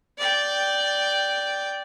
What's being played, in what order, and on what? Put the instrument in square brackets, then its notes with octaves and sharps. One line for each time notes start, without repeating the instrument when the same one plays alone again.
[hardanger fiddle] D5 G5